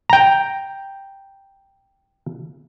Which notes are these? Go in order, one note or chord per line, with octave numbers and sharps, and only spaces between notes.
G5 A#5